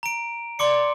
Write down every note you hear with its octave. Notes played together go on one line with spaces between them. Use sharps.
A#5 D7
D5 C6 D6 C#7